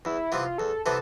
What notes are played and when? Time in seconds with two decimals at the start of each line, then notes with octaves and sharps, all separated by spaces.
0.05 E2 E4
0.32 C3 E3 B3 F4
0.58 E2 A4
0.86 C3 E3 B3 A4